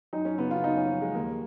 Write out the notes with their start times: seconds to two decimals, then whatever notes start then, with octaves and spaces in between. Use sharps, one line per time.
0.13 F#2 D#4
0.25 C#4
0.38 C#3 B3
0.51 F4
0.64 F#2 D#4
0.77 C#4
0.90 F3
1.02 G#3
1.15 D#2 A#3